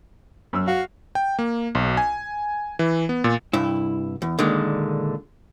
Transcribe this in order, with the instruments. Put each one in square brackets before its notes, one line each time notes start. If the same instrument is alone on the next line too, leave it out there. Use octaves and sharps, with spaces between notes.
[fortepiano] F#2 E6
[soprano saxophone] F#4 [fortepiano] F5
[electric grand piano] G5
A#3
B1
G#5
E3
B3
A#2
[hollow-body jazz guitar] C2 G2 E4
E2
A#2 D3 D#3 G#3